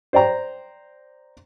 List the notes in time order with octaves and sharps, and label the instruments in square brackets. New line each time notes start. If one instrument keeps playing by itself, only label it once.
[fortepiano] C5 D5 G5 A#5